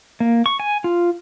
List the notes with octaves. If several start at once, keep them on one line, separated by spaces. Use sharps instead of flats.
A#3
C#6
G#5
F4